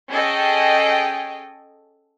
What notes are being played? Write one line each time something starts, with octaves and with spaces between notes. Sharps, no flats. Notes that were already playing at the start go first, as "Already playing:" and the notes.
C#4 G#4 A4 D#5 G5